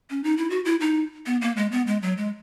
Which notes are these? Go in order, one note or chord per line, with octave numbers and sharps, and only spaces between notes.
C#4
D#4
E4
F#4
E4
D#4
B3
A#3
G#3
B3
G#3
F#3
G#3